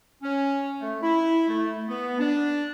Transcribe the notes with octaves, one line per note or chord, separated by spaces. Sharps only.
C#4
A3
E4
A3
B3
D4